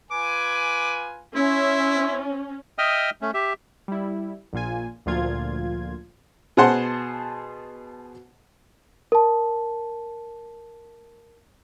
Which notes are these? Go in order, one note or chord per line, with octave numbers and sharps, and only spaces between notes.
F4 B4 G#5 D6
C#4 E4 E5 C6
D#5 E5 G5 D#6 F6
A3 C#4
G4 E5
G3 E4
A#1 A#2 F4 G#5
D2 A#2 F3 F4 G#6
B2 G#4 C5 F#5 A5 C6
A#4 A5